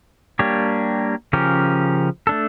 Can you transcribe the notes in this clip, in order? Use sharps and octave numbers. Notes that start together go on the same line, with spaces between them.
G3 A#3 D4 G4 C#5
C#3 F3 C#4 G4 A#4
A3 D4 A4